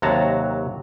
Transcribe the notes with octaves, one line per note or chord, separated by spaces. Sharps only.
D#2 C3 F#3 F#4 A5 A#5